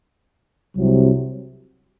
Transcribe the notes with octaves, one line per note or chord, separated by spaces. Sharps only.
C2 C3 F#3